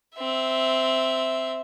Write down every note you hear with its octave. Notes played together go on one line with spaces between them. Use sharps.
C4 E5